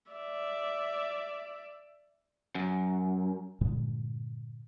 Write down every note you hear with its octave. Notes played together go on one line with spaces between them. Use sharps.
D5 E5
F#2
G2 A#2 D3 G#3